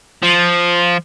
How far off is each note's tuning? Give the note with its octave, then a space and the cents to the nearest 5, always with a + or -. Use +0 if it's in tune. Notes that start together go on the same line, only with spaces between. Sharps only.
F3 +0